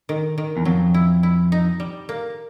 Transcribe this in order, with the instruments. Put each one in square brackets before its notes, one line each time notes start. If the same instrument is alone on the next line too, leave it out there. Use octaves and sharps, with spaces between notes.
[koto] D#3
D#3
[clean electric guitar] E2
[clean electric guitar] F2 [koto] F#3
[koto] E4
E4
D#4
G3
A#3